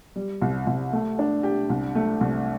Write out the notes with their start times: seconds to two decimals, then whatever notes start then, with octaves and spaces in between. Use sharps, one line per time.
0.16 G3
0.41 C2
0.67 C2
0.93 A3
1.19 D4
1.43 G4
1.69 C2
1.95 A3
2.21 C2